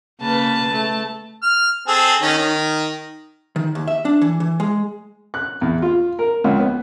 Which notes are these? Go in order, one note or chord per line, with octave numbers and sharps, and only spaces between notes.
C#3 A#3 B4 A5
A3
F6
C4 G#4 A4
D#3 C#4
D#3
D#3
D#2
E5
D4
E3
E3
G#3
F#6
E2
F4
A#4
C#2
B3